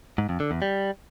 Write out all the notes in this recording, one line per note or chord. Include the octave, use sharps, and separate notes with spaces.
G#2
F2
D3
E2
G3